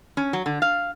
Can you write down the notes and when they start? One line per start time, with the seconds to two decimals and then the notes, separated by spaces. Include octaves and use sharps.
0.17 C#4
0.33 F#3
0.46 D3
0.62 F5